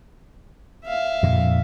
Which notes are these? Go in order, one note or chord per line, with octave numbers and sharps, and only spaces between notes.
E5 F5
F2 A#2 D3